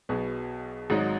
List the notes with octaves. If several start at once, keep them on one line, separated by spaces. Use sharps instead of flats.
B1 B2 B3 G#4
G#1 G#2 F#3 D#4